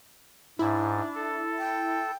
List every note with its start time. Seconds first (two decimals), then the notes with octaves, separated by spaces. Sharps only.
0.59 G#2 D4 E4
1.15 A4
1.59 G5